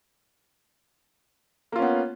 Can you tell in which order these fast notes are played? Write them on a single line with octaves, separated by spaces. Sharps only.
A#3 F4 C#4 B3